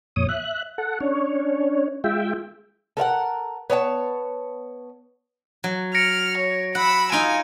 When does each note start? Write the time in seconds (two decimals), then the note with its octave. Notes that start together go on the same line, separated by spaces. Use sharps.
0.16 F2 A#2 C#5 D#6
0.29 E5 F#6
0.78 A4 F#5
1.00 C#4 D4 C#5
2.04 G#3 F4 E5 G5
2.97 A4 A#4 F5 F#5
3.70 B3 C#5 D5 A5
5.64 F#3
5.95 F6 A#6 C#7 D7
6.37 C#5
6.75 F#5 B5 E6
7.12 D#4 F4 G#5 D7